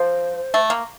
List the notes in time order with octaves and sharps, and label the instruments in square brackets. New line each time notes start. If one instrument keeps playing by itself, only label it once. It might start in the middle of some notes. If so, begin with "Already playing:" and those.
Already playing: [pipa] F3 [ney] C5
[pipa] A3
A#3